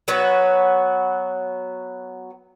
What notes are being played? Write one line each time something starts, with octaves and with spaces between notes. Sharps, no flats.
F#3 B3 F#4 B4